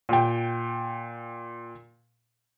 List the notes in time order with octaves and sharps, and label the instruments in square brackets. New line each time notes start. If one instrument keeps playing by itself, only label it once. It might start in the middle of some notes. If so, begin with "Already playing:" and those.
[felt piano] A#2 G5